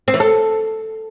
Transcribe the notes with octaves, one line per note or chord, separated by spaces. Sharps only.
C4
E3
A4